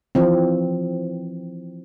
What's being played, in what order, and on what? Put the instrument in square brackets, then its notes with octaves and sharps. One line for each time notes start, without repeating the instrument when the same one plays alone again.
[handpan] E3 F3 C4